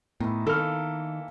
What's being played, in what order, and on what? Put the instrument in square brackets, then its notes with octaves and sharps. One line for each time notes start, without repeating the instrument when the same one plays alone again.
[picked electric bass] A2 [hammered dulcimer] D#3 E3 [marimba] B3
[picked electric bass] D#3 [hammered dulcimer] E3 A#3 [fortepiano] A4 F6